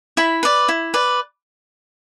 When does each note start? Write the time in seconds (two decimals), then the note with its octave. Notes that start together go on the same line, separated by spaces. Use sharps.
0.17 E4 B5
0.43 B4 D5
0.68 E4
0.94 B4 D5